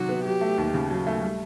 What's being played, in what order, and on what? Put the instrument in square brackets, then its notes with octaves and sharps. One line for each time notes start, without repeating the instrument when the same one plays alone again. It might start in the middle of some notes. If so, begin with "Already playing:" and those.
Already playing: [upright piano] C3 D#3 F#3 [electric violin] F#4
[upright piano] B3
[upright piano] F#3 [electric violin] G4
[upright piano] A3
D#2
C#3
F#3
A3
G3